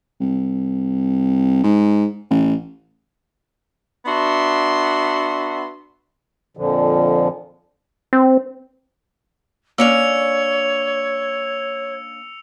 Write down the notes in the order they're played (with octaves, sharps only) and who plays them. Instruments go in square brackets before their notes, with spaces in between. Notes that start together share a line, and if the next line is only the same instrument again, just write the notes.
[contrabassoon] C2
G#2
A1
[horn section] B3 D4 F#4 E5 C6
[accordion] F2 A#2 D3 F3
[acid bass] C4
[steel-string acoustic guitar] A#3 C#4 D4 [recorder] C#5 [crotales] E6 C#7 F7